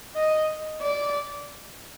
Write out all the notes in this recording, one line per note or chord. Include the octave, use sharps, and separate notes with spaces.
D#5
D5